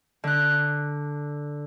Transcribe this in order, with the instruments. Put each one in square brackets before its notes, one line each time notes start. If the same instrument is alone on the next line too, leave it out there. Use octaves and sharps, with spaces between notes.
[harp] D3 F#6